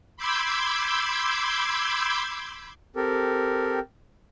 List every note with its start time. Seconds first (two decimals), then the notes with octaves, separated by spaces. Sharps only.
0.17 B5 C6 D6 E6 G6 G#6
2.96 C4 G4 A4 A#4